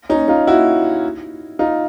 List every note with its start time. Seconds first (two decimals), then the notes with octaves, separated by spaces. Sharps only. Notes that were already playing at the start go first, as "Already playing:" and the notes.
0.09 C#4 D#4
0.28 D#4 F4
0.47 E4 F#4
1.59 D#4 F4